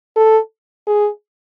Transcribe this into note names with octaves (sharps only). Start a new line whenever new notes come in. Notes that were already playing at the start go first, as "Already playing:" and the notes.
A4
G#4